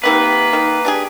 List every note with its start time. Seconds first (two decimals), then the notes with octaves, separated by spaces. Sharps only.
0.04 C3 D#3 A#3 B3 B4
0.53 D#3
0.85 D4 G4 G#4